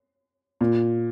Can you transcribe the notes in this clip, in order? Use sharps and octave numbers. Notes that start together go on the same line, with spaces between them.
A#2